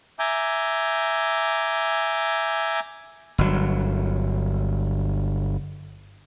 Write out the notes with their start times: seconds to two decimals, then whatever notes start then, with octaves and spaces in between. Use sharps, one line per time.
0.19 E5 G#5 A#5 D6 G6
3.38 G1 F#3